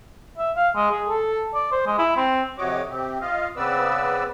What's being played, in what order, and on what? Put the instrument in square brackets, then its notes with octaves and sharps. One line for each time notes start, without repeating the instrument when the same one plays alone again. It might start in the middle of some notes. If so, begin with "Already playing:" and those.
[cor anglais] E5
F5
G#3
G#4
A4
D5
C5
G#3
E4
C4
[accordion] F2 C3 F#4 C#5 D#5 D6
C3 C4 G4
F4 D#5 F5
C#3 B3 C4 B4 D5 E6